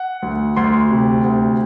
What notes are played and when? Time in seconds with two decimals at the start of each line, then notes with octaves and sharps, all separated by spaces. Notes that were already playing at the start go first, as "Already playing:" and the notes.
Already playing: F#5
0.22 D2
0.56 D2 C6
0.91 C3
1.25 D2